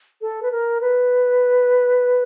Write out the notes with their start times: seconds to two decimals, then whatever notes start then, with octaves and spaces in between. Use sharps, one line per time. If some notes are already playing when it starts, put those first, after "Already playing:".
0.21 A4
0.43 B4
0.52 A#4
0.81 B4